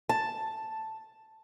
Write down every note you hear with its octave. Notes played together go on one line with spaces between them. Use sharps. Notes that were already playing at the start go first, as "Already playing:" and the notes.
A5